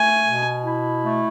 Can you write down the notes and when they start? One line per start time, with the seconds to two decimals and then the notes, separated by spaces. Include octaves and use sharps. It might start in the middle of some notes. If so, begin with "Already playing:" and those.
Already playing: A3 G#5
0.24 B2
0.65 E4
1.04 A3